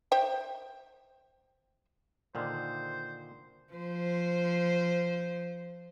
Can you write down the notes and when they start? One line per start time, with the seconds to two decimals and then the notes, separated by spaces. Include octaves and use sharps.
0.12 C5 E5 G5
2.35 A#2 D3 D#3 C5
3.73 F3 C5